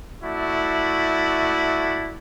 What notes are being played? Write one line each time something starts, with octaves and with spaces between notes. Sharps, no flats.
A3 E4 F#4 D5